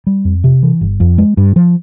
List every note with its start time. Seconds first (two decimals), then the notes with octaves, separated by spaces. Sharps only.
0.07 G3
0.25 F2
0.44 C3
0.63 E3
0.81 G1
1.00 F2
1.18 G#3
1.37 G2
1.56 F3